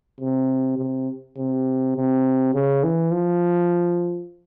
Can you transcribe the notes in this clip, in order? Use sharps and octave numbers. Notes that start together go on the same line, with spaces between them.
C3
C3
C3
C3
C#3
E3
F3